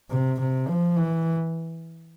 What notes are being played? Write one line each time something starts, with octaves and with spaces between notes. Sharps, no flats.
C3
C3
F3
E3